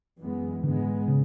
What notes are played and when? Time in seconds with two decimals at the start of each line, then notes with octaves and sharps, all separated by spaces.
0.19 F#2 E3 G#3 B3
0.63 G#2 D3 G#3 B3
1.08 C#3